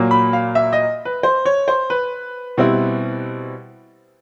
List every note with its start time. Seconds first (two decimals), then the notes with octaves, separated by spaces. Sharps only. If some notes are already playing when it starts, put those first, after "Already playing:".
Already playing: A#2 F#3 A#3
0.11 B5
0.33 F5
0.55 E5
0.73 D#5
1.05 B4
1.23 C5
1.45 C#5
1.68 C5
1.90 B4
2.58 B2 G3 C4 E4